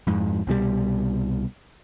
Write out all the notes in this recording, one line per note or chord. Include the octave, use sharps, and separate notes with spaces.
F2 G#2
C2 B2 D#3 G3